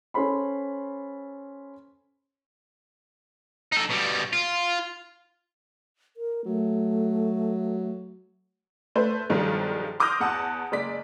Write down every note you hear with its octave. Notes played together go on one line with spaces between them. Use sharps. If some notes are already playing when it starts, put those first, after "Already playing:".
C#4 A4 C5 B5 C6
D#4 A4
B2 G3
F4
A#4
F#3 A3
A3 B4 C5
B1 G2 D#3 F3 G#3
C6 D6 D#6 F6 G6 A#6
E2 F#5 A5 D#6
F#1 G#3 D5 B6